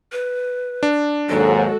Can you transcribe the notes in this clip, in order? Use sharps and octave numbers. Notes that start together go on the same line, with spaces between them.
B4
D4
D#2 G#2 F#3 G#3 F#4 A4